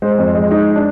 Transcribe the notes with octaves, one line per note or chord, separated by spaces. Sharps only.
G#3 C5
F2
G#3
G#3 D#4
D4